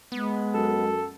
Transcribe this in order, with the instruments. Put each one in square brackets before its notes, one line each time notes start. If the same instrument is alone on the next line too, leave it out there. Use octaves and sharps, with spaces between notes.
[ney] G#3 [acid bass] B3
[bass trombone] F#2 [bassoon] A4